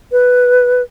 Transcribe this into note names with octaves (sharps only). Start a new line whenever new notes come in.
B4